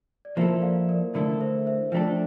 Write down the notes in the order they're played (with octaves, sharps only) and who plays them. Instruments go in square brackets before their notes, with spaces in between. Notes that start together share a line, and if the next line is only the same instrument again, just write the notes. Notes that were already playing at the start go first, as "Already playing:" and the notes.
[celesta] D5
[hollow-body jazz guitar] F3 A#3 E4 A4 [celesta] C5 E5
[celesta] D5 F5
A#4 D5
[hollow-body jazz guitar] D3 A3 E4 A4 [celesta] A#4 D5
[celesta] C5 E5
C5 E5
[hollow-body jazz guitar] F3 A3 D4 A4 [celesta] E5 G5